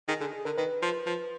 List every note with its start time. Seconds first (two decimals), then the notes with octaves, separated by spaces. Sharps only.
0.08 D#3 G#4
0.20 D3 G#4
0.33 G#4
0.45 D3 A#4
0.57 D#3 B4
0.82 F3
1.06 F3